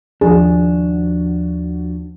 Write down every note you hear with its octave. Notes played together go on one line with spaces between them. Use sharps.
D#2 F3 D4 F#4 G#4